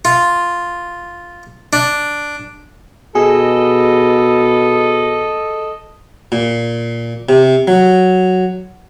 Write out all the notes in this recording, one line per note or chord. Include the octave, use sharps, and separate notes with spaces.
F4
D4
B2 G#4 A4 D#5
A#2
C3
F#3